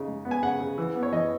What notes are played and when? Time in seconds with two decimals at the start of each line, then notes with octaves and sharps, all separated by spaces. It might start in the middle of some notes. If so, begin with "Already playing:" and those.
Already playing: C#3 D#4
0.08 G#3
0.25 B3
0.31 G#5
0.43 C#3 F#5
0.60 C#3
0.78 E3
0.95 B3
1.03 C#5
1.12 E3 D#5